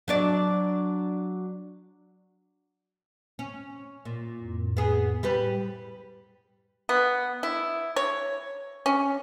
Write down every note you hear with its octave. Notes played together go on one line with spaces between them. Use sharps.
F#3 D4 D5
C#4
A#2
F2 A2
B3 G#4
A2 G3 G4 B4
B3
E4
C#5
C#4